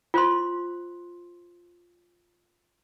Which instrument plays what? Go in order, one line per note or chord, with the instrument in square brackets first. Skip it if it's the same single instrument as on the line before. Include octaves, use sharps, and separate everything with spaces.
[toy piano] F4 C5 C6